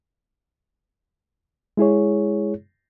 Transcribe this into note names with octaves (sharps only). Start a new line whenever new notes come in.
G#3 E4 G#4 C#5